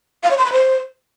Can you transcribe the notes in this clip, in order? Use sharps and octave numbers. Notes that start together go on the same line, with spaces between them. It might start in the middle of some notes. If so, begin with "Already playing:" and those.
F5
C#5
C6
B5
C5